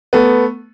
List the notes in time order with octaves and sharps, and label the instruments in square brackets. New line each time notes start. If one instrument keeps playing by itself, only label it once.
[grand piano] A3 B3